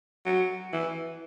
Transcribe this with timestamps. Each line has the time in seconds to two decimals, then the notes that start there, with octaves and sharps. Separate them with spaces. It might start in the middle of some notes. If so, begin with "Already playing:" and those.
0.26 F#3
0.73 E3